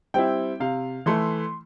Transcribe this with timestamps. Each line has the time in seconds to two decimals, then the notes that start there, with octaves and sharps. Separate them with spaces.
0.14 G3 C4 E4 G5
0.60 C3 F5
1.06 E3 A3 C6